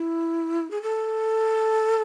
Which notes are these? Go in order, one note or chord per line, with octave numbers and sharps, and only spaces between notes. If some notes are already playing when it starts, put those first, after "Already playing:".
Already playing: E4
G#4
A4